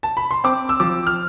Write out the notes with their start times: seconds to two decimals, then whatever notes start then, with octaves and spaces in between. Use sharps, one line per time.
0.03 A5
0.17 B5
0.31 C6
0.44 C4 D6
0.69 E6
0.80 F3 D6
1.07 F6